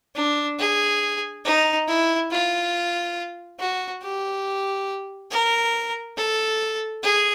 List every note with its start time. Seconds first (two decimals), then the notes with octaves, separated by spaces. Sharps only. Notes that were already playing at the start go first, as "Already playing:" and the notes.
0.15 D4
0.59 G#4
1.45 D#4
1.87 E4
2.31 F4
3.59 F#4
4.02 G4
5.31 A#4
6.17 A4
7.03 G#4